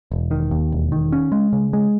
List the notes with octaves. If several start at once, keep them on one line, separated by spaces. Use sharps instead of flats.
E1
D#3
D#2
E1
D#3
C#4
G#3
C#3
G#3